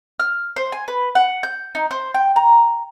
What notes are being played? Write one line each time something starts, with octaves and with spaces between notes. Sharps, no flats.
F6
C5
G#5
B4
F#5
G6
D#4
C5
G5
A#5